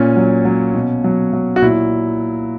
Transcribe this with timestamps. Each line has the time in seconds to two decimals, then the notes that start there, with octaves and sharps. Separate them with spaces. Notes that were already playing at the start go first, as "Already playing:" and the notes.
Already playing: A#2 C#4
0.16 F#3
0.45 F#3
0.74 B2
1.04 F#3
1.33 F#3
1.56 F#4
1.62 A#2 E4